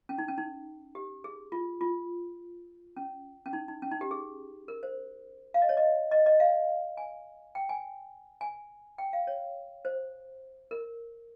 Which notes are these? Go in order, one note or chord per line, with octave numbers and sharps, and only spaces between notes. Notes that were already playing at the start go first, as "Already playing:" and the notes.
C#4
D#4
C#4
D#4
G4
G#4
F4
F4
C#4
C#4
D#4
D#4
C#4
D#4
G4
G#4
A#4
C5
F5
D#5
C#5
D#5
D#5
D#5
F5
G#5
G5
G#5
G#5
G5
F5
C#5
C5
A#4